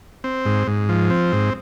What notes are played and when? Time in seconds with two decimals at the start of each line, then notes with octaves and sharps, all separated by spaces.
0.24 C4
0.45 G#2
0.68 G#2
0.89 F3
1.10 C4
1.32 G#2